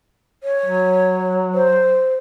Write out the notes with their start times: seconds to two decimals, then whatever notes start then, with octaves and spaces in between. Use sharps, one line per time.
0.44 C#5
0.66 F#3
1.54 C5